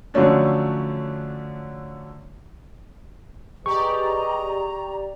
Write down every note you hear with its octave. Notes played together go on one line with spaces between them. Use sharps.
D3 F3 F#3 A3 C#4 D4
G4 G#4 B4 D5 D#5 A#5 C#6